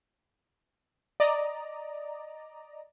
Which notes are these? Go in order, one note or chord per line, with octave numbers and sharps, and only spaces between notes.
D5 D#5 A#5